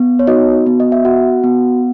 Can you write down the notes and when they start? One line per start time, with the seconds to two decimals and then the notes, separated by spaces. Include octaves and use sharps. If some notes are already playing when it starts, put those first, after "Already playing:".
Already playing: B3
0.19 C#5
0.27 D#4 F#4 D#5
0.66 B3
0.80 D#5
0.92 E5
1.05 F#4 F#5
1.44 B3